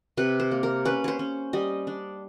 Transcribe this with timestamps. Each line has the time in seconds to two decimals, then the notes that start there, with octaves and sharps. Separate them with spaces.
0.17 C3 B4
0.40 C5
0.51 A#3
0.63 A#4
0.85 C#4 B4
1.04 C5 C#5
1.19 C#4
1.53 G3 D#5
1.87 D4